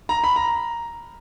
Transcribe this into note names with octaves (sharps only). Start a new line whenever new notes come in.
A#5
B5
A#5